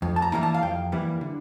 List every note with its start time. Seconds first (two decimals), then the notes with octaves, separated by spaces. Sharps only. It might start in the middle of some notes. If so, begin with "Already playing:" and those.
0.02 F2
0.16 A5
0.22 A#5
0.32 E3 G3 A#3 E4 A#5
0.43 A5
0.54 F5
0.63 F2 G5
0.92 E3 G3 A#3 E4
1.21 D3